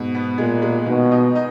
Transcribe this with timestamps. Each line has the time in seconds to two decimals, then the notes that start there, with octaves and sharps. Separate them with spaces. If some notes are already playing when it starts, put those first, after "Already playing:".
Already playing: G#2 B2
0.15 B3
0.38 A#2 G#3
0.62 G#3
0.86 B2 D#3
1.11 D#4
1.35 D#4